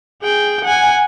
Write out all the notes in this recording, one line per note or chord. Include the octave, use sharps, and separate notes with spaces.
G#4 G5
F#5 G#5